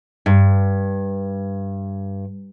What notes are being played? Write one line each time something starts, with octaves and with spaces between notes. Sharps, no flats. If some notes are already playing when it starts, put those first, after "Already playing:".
G2